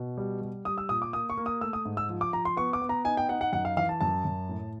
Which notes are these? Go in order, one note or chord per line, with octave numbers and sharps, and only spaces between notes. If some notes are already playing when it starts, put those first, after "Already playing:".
Already playing: B2
G3
G3
G3 D#6
E6
A#2 D#6
D6
A#3 D#6
C#6
A#3
D#6
A3 E6
D#6
G#2
E6
F3
D6
F3 A#5
C6
B3 C#6
D6
B3
A#5
D#4 G#5
G5
D#4 F#5
F#5
F#2 F#5
F5
E3 F5
A5
F#2 A5
F#2
A2